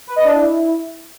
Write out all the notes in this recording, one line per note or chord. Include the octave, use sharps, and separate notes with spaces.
B4
D#5
D4
E4